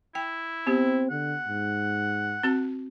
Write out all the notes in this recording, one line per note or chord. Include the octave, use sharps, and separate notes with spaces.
E4 G5
B3 C4 G4
D3 F#5
G#2
C4 F#4 A5